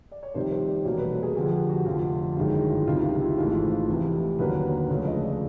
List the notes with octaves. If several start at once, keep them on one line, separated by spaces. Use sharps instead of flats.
D5
C#5
F1 F2 C3 D#3 G3 C5
C5
D5
F1 E2 B2 G3 A#3 C#5
B4
A4
G#4
F2 D3 F3 G#4
G4
F#4
F1 F2 D3 F4
G1 F#2 D#3 G#3 F4
E4
F4
C#2 C3 D#3 F4
F4
E4
G#1 G#2 E3 A3 F4
F4
F4
F1 E2 C3 E3
D#2 D3 F#3 A#3 D4 B4
C#2 C#3 F3 A3 C#5
D#5
D5